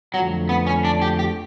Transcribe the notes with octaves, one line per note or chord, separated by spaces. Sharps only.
F2 D3 F3 F#3 A3
B3
C#4
D4
G4
G4